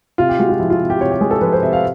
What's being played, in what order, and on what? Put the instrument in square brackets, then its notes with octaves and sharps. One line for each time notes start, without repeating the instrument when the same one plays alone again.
[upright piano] C3 F4
G4
G#3 F#4
F4
F3 E4
F4
C3
G4
C3 C#5
G4
G#3 G#4
A4
F3 B4
C5
C3 E5
F5